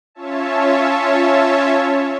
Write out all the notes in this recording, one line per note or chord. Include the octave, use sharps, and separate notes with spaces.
C#4 F4 C#5 E5 A5